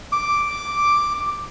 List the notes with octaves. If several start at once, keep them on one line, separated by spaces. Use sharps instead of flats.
D6